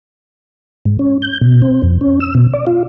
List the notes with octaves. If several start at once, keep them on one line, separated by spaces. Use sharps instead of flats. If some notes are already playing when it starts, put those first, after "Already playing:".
G#2
C#4
G6
B2
C4
F2
C#4
E6
B2
D5
F4